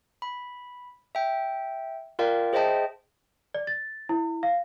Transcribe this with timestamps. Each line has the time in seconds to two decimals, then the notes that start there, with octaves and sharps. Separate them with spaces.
0.22 B5
1.15 E5 G5
2.19 F4 A#4 D5 F5 G5
2.53 G#4 C5 D#5 E5 G5 A5
3.54 D5
3.67 A6
4.09 E4
4.43 F5